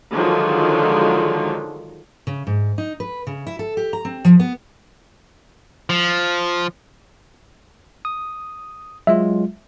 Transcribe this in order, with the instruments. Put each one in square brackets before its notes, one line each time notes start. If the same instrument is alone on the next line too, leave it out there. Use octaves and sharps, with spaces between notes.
[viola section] D3 D#3 F3 F#3 G#3
[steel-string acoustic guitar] C#3
G#2
D#4
B4
C#3
E4
A4
G4
A#5
C4
F3
B3
[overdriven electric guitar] F3
[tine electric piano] D#6
[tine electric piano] F#3 G#3 F4 [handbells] E5